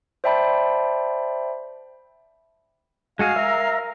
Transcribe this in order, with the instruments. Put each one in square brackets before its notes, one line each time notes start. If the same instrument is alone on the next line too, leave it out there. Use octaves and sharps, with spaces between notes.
[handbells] C5 D5 E5 G5 A5 B5
[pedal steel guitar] G#3 F#4 G#4 [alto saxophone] F5
[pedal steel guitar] A#4 [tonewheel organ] E5 A#5